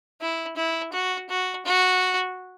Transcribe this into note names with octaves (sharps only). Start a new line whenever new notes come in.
E4
E4
F#4
F#4
F#4